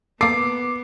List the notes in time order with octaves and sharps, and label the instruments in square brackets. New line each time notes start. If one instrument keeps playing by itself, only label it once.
[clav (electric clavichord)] A#3 A4 [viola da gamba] B3 [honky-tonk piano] D6 [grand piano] C7